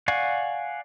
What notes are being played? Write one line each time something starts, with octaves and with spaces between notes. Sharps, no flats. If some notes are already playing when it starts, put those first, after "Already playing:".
D5 F5 F#5 G#5 C#6